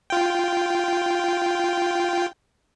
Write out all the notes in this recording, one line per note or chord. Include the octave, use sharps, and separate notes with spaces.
F4 G5